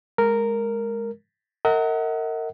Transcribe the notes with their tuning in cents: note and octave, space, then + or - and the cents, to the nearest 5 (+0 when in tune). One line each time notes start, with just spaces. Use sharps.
G#3 +0 A#4 -5
A#4 -25 D#5 +45 F#5 +10